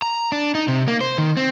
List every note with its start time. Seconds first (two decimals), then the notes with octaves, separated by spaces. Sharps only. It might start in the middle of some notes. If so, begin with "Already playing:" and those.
0.02 A#5
0.32 D4
0.55 D#4
0.68 C3
0.88 A#3
1.01 C5
1.18 D#3
1.37 C4